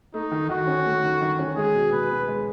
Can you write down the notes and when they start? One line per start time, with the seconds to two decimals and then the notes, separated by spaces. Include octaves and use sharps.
0.14 A3 D#4
0.32 D#3
0.49 D#3 F#4
0.67 C#4
0.86 A3
1.04 D#3
1.21 D#3
1.39 C#4
1.56 G#3 G#4
1.75 B2
1.92 B2 B4
2.10 B3
2.28 G#3